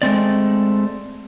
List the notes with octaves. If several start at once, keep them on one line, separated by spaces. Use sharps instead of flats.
G#3 A3 C4 D5